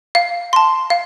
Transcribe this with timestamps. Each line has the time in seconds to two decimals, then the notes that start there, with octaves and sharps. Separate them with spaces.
0.15 F5
0.53 A5 C6
0.90 F5